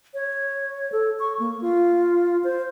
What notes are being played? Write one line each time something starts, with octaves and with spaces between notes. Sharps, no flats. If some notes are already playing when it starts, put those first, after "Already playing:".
C#5
A4
C#6
A#3
F4
C5